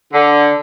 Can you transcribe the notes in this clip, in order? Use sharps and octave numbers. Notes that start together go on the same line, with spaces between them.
D3